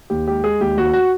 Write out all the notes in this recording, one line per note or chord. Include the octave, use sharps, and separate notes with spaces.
D#2 G4
G#3 G4
G#3 G#4
D#2 G4
D#2 F#4
F#4